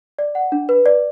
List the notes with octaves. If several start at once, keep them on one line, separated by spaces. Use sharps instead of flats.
D5
F#5
D4
B4
D5